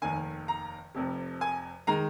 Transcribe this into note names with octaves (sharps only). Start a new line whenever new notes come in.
F1 D#2 D#3 G#5
A#5
F1 F2 C3
G#5
D#3 G#3 A#5